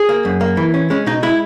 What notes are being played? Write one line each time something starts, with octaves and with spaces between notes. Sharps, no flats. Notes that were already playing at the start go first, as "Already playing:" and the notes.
Already playing: G#4
A#3
F#2
A#3
E3
C#4
G#3 C#4
B2 D#4
G#3 E4